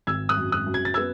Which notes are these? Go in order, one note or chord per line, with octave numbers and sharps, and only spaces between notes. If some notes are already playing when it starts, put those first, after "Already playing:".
G#1 E6 G#6
D#6 F#6
F#2
D#6 F#6
F#2
G#6
A6
B3 E6 G#6